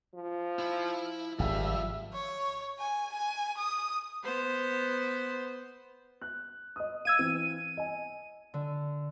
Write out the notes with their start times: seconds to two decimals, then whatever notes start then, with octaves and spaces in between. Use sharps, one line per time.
0.14 F3
0.59 E4 B5
1.39 G#1 F3 G3 E5
2.14 C#5
2.79 G#5
3.12 G#5
3.58 D#6
4.24 B3 C5
6.21 F#6
6.76 D#5 D#6
7.05 F5 E6 G#6 D#7
7.19 E3 C4 D#7
7.77 D#5 G#5
8.54 D3